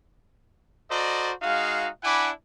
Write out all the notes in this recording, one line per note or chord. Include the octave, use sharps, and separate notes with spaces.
F#4 A4 C5 D5 D#5 A#5
G#3 D#4 F#4 F5
D4 E4 F#5 G#5 B5 D6